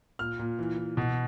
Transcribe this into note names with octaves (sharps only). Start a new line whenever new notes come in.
A#2 F6
A#2
E3
E3
B2